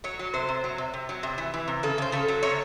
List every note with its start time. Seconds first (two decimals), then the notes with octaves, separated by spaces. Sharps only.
0.04 F#3 C#5
0.19 F#3
0.34 C3 C5
0.49 C3
0.64 F#3
0.78 C3
0.94 C3
1.09 F#3
1.23 C3
1.38 E3
1.54 E3
1.68 C3
1.83 C#3 A4
1.98 C#3 C5
2.12 C#3 A4
2.28 F#3
2.43 C3 C#5